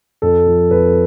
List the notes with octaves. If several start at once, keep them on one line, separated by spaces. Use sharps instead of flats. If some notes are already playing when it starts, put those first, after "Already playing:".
F2 A4
F3
F2 B4